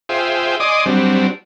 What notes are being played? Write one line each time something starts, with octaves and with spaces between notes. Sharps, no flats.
F4 G#4 C5 E5 G5
D5 D#5 G#5 C6 D6 D#6
F#3 G3 C4 D4